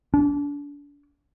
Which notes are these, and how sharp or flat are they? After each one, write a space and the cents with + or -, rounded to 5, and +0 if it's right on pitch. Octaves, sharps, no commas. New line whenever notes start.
D4 -35